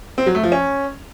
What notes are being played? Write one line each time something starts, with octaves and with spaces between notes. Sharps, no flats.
C4
F#3
A3
F3
C#4